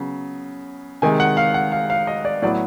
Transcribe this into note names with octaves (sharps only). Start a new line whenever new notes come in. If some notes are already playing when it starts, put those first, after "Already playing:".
Already playing: C#3 F#3 B3
C3 D#3 G#3 G#5
F#5
F5
F#5
F5
F5
D#5
D5
A2 F#3 B3 D5